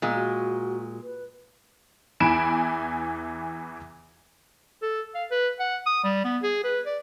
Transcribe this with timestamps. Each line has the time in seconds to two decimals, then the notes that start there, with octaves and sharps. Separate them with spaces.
0.02 A#2 G#3 B3
0.14 F#4
1.03 B4
2.20 E2 E3 G#5 B5 D7 E7
4.82 A4
5.15 F5
5.31 B4
5.60 F#5
5.86 D#6
6.04 G3
6.24 B3
6.43 G#4
6.64 B4
6.86 D5